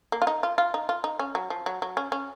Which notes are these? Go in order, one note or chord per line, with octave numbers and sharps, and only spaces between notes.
A#3
F4
D#4
F4
F4
D#4
F4
D#4
C#4
F#3
F3
F#3
F#3
C#4
C#4